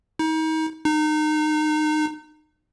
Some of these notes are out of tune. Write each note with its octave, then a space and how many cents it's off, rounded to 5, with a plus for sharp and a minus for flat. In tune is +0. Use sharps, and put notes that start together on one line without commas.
D#4 +35
D#4 -25